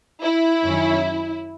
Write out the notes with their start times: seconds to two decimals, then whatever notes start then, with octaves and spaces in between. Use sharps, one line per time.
0.23 E4
0.64 F#2 D#3 F#3 C#4